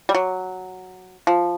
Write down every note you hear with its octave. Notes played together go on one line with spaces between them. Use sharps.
G3
F#3
F3